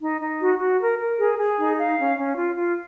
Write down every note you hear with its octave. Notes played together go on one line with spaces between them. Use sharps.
D#4
D#4
F#4
F#4
A#4
A#4
G#4
G#4
D#4
F5
C#4
C#4
F4
F4